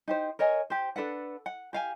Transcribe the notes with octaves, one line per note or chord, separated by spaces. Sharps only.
D#4 G4 C5
A#4 C#5 D#5 G#5
G4 C5
D4 A4 B4 F#5
F#5
G4 F5 G#5